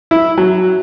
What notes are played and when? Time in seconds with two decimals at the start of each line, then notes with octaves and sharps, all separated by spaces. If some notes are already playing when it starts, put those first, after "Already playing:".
0.11 E4
0.38 F#3